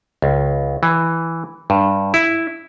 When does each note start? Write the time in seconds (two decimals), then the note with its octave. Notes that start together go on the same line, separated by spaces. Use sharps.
0.22 C#2
0.83 E3
1.70 G2
2.14 E4